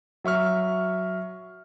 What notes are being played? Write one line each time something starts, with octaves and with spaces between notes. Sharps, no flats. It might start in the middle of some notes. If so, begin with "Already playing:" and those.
F#3 E5 C#6 F6